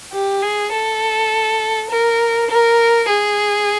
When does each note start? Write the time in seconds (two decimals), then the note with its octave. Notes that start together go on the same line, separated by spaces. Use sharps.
0.13 G4
0.42 G#4
0.72 A4
1.90 A#4
2.50 A#4
3.09 G#4